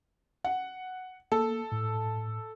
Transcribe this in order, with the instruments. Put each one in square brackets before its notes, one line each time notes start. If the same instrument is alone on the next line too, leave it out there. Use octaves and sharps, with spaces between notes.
[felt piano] F#5
[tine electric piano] A#3 [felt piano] A4
[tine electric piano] A2